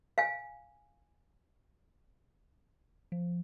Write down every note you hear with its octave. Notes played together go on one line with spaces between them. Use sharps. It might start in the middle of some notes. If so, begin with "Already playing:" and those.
F5 G#5
F3